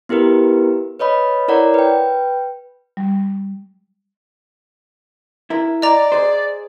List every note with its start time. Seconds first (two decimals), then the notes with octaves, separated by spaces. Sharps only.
0.09 B3 E4 G4 A#4 B4
0.99 B4 C#5 D#5 B5
1.48 E4 A#4 C#5 D5 F#5 A#5
1.74 B4 G5
2.97 G3
5.50 E4 A#4
5.82 D5 D#5 A#5
6.12 G#4 C5